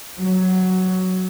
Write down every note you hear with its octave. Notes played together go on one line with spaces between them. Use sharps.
F#3